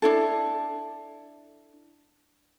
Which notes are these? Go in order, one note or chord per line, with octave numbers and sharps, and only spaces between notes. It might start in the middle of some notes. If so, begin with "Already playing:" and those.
D4 E4 A4